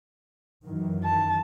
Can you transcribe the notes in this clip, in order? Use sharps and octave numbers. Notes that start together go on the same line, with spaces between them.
F#2 D#3 E3
A5